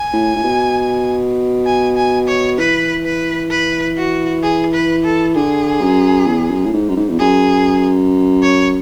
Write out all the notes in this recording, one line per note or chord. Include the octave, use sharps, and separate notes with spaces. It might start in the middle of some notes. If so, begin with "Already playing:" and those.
Already playing: G#5
A2
A2
B2
G#5
G#5
C#5
E3 B4
B4
B4
F#4
G#4
B4
A4
D3 G#4
F#2
E2
F#2
A2
G#2
F#2
G#2
E2
F#2 G#4
C#5